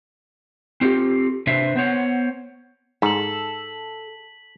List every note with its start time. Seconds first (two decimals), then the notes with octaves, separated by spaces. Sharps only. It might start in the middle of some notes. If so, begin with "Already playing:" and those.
0.81 C4 F4 G4 A4
1.47 C3 D4 B4 C5 E5
1.76 B3 C5 C#5 F#5
3.02 G#2 A4 B6 F#7